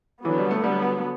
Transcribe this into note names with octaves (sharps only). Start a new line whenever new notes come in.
D3 E3 F#3 B3
G3
A3
D3 F#3 G3 B3